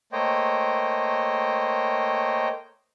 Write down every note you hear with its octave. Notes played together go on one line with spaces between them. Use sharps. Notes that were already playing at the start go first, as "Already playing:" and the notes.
A3 A#3 C5 C#5 D#5 G5